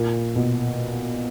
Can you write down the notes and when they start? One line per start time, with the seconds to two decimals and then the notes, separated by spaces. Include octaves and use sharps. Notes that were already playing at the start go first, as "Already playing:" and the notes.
Already playing: A#2
0.36 B2